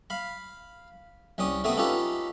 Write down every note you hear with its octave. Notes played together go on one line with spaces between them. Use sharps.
F5 B5
C2 G3 C#4 D#6
C3 A3 B3 C4 D#6
C#4 D#4 F4 G4 A4 B4